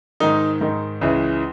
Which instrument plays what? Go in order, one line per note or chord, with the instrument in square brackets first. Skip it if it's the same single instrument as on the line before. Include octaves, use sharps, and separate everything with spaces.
[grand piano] G#2 D#3 D#4
G#2 D#3
C#2 C#3 E3